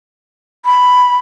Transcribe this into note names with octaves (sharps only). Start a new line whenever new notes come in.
B5